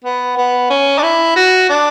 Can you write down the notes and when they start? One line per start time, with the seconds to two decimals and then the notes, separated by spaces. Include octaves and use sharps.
0.04 B3
0.37 B3
0.70 C#4
0.98 D4
1.03 E4
1.36 F#4
1.70 D4